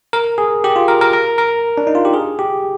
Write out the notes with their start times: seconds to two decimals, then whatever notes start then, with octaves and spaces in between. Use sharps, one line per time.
0.13 A#4
0.38 G#4
0.64 G4
0.76 F4
0.88 A#4
1.01 A#4
1.13 A#4
1.38 A#4
1.78 D4
1.87 D#4
1.95 F4
2.05 G4
2.14 G#4
2.39 G4